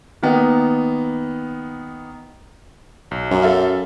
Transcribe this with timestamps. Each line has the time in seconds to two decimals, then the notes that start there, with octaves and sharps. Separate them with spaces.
0.23 D#3 A#3 B3
3.11 B1
3.31 F#2
3.42 A4 E5 F5